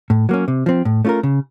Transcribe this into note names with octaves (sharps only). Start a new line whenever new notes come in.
A2
F#3 A#3 C#4
C3
F3 C4
A2
A3 C#4 F4 A#4
C#3